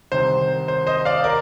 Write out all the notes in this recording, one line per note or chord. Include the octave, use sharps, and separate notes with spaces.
C2 C3 D#3 C5
C5
C5 D#5
D5 F5
A#4 D5